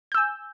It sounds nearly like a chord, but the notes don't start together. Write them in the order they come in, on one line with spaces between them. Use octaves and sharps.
G6 E6 G#5